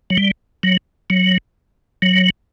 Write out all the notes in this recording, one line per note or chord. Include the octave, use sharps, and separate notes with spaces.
F#3
G3
F#3
F#3
F#3